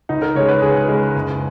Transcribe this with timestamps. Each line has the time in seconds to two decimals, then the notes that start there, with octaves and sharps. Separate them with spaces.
0.09 C#2 D#4
0.22 A#4
0.35 C#3 G#3 C#5
0.49 B4
0.62 C#2 G#4
0.88 C#3 G#3
1.15 F#1